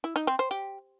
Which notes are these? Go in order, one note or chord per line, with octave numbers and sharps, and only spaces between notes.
E4
D#4
C4
C5
G4